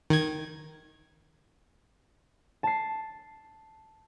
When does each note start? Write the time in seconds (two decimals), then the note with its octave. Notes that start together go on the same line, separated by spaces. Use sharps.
0.10 D#3 G#6
2.63 A5 C7